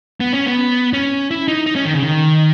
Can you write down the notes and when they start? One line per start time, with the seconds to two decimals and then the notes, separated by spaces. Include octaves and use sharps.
0.20 B3
0.33 C#4
0.46 B3
0.93 C#4
1.31 E4
1.48 D#4
1.67 D#4
1.76 C#4
1.85 D#3
1.94 C#3
2.03 D#3